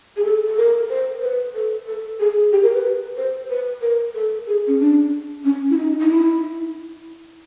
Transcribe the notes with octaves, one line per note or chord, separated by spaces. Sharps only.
G#4
A4
A4
A#4
C5
B4
A4
A4
G#4
G4
A#4
B4
C5
B4
A#4
A4
G#4
C#4
D4
C#4
E4
D#4
D#4
E4